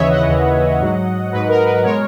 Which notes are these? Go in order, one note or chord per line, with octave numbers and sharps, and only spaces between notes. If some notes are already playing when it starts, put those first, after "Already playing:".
Already playing: D#2 C#3 E3 B4 C#5 D#5 E5
D#5 F#5
D#2 C#3 E3
G#2 F#3
G#2 F#3 B4
A#4
B4
B2 G#3 A#4 C#5